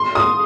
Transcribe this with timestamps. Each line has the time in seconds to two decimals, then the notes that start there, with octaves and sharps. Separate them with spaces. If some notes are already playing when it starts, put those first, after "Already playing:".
Already playing: C6
0.15 D#6